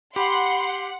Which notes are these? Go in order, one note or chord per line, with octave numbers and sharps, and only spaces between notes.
G4 F#5 B5 C6